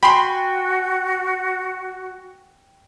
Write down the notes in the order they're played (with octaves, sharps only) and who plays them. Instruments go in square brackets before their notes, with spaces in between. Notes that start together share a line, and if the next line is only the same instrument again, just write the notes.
[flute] F#4 [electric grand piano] G5 G#5 [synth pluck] B5 C6